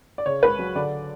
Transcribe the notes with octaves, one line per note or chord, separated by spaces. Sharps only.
D5
C#3 C#5
C#2 B4
F#3
D3 D5